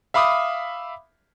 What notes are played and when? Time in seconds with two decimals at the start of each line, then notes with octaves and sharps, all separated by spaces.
0.14 E5 F5 B5 D6 D#6